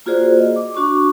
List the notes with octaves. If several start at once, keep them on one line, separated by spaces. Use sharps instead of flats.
A#3 F4 F#4 G#4 C5 D5
D#5
D6
D4 F#4 C#6 D6